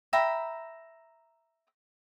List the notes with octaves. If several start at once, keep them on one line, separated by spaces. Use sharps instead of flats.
E5 G5 A#5 B5